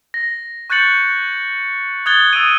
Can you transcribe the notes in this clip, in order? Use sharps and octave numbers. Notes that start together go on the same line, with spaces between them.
A#6
C#6 F#6 G6 A6 C#7 F#7
D#6 F#6 G#6 A6 G7
D#6 E6 G#6 A6 D7 D#7